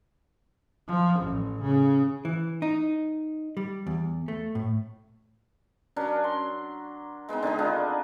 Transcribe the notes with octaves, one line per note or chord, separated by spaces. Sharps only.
F3
A1
C#3
E3
D#4
G3
E2
A3
A2
F#3 C#4 D4 A#4
C6
G#3 B3 C4 D#4
D3 D#3 G#3 G#4
D4 D#4 F4